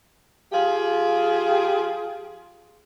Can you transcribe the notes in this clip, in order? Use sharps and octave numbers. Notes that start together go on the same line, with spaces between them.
F3 F4 G4 G#4